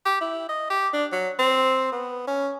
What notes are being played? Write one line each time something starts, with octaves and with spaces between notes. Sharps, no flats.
G4
E4
D#5
G4
D4
F#3
C4
B3
C#4